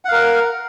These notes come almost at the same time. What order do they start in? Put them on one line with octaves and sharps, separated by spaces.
F#5 F5 A#4